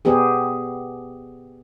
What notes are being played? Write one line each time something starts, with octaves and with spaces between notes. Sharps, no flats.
B3 G4 G#4